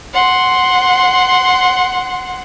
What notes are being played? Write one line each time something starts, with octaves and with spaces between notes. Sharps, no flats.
F#5 C6